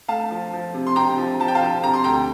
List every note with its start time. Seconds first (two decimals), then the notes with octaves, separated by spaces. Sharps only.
0.08 A3 F5 A5
0.31 F3
0.53 F3
0.74 C3
0.87 C6
0.96 C3 G5 A#5
1.18 F3
1.40 F3 A5
1.48 G5
1.55 F5 A5
1.62 F3
1.84 C3 A#5
1.93 C6
2.04 D2 G5 A#5